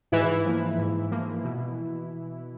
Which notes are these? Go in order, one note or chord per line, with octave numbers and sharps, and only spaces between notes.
G#2 E3 E4
F3 A#3
G#2
F3 A#3
B2